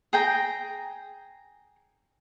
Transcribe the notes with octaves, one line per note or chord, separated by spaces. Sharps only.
G#4 G5 A#5